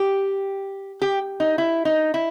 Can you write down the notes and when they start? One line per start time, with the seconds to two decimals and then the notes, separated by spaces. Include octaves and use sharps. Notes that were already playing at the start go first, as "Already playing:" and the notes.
Already playing: G4
1.02 G4
1.40 D#4
1.58 E4
1.85 D#4
2.14 E4